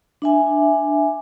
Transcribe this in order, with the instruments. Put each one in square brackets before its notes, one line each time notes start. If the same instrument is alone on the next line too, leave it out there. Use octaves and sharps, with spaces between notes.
[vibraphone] D4 E5 G#5